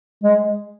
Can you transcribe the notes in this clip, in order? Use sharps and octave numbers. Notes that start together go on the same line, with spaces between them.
G#3